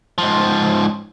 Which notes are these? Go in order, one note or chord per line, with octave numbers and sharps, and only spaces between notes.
G#2 F3